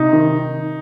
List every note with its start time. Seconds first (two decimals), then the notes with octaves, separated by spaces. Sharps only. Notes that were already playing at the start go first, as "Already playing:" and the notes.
Already playing: C3 D#4
0.13 D#3